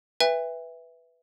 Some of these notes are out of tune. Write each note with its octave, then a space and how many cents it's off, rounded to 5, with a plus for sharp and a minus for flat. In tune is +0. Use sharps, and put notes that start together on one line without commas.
B4 +0 E5 +0 G#5 -45